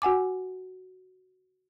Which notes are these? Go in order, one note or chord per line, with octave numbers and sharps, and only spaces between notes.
F#4 F#5 G#5 D6